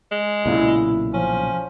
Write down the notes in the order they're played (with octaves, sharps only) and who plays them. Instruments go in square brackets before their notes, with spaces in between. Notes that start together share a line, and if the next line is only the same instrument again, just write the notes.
[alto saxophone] G#3
[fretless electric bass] B1 A#2 C#3 [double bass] E4
[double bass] F3 [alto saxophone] C#4